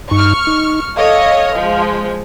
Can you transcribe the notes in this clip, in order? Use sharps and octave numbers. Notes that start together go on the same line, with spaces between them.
G2 D#4 C#6 F6
D#4
A4 C#5 D#5 F5
F3 G#3